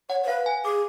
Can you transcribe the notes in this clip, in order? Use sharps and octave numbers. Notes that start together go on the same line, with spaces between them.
C#5 F#5
C#5
B4 F5
G#5
G#4 D6